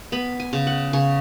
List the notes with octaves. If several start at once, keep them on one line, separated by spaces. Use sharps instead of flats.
B3 B5
G#5
C#3
F#5
C#3 C#5